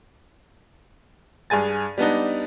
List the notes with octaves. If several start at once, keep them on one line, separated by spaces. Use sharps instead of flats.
G2 G#4 G#5 A6
G3 B3 D4 D#4